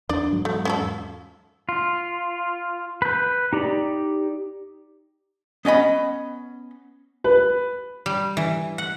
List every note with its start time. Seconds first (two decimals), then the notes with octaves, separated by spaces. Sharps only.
0.09 E2 D4 D5
0.32 E2 G#2 F#3
0.45 A3
0.65 C#4 F4 A4
1.69 F4
3.02 B4 G6
3.53 D#4 G4 D5
5.65 B3 C#4 D#5 B5
7.24 B4
8.06 G3
8.37 E3
8.78 F#5